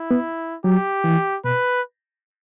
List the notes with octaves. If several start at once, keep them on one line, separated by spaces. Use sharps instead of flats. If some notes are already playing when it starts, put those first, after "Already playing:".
Already playing: E4
B3
F#3 G4
E3
B2 B4